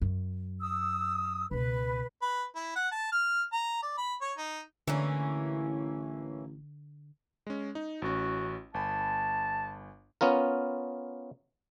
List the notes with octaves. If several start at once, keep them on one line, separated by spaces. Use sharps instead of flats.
F#2
D#6 E6
C#2 B2 B4
B4
E4
F#5
A5
F6
A#5
D5
B5
C#5
D#4
A1 D3 E3 A#3 C#4
G#3 C#4
D#4
A1 C#4 F#4
G1 G#5 A5 B5
B3 C#4 F4 A#4